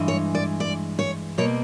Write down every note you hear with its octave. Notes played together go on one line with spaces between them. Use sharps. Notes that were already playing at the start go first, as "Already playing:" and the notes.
Already playing: G2 E3 G#3
C#5
D5
D5
C#5
B2 G3 A#3 C#5